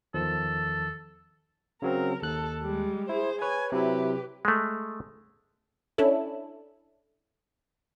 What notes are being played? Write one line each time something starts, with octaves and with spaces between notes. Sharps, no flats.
E2 D#3 F3 A4
C#3 F#3 C4 A#4
D#2 A4 F#6
G3 G#3
E4 G#4 C5
B4 C#5 G#5
C3 F#3 E4 G4 B4
G#3 A3
C#4 D4 E4 A4